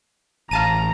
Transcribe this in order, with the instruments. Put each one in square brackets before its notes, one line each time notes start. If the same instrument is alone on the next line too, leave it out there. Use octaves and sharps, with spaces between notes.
[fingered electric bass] A1 [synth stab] F5 A5 D#7 [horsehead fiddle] A#5